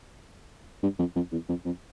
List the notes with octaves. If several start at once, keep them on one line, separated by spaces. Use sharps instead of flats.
G2
F2
F2
E2
F2
F2